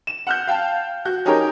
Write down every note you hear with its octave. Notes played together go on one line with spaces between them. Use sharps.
E7
F#5 F6 G6
F5 G5 A5
F#4 G6
C#4 D#4 G4 G#4 A#4 C#5